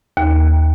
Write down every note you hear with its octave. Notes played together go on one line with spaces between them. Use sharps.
D#2